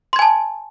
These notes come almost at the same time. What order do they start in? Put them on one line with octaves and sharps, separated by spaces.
C6 G#6 G#5 A5